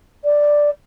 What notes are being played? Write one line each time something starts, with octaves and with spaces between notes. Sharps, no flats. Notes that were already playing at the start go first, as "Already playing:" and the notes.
D5